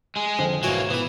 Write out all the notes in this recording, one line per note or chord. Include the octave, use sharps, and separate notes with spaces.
G#3 G#4
F2 D3 D4
E1 G#2 C3 E3 A#3 F#4 C#5 G#5
E3 B3 E4